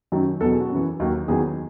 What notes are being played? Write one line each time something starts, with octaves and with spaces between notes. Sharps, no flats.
F#2 D#3 F#3
E2 B2 F#3 A4
G#4
F#4
F#2 E3
D#2 D#3 F#3
E2 D#3 F#3 G#4